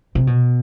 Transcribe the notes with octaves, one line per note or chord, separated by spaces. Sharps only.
C3
B2